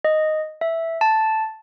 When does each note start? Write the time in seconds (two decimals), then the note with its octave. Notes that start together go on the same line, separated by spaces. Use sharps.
0.05 D#5
0.61 E5
1.01 A5